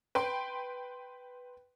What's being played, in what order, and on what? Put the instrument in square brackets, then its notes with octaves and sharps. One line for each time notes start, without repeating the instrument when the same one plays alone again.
[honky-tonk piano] B4 G5 C6